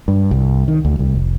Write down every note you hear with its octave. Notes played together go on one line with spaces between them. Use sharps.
G2
C2
D#3
D2
C2
F1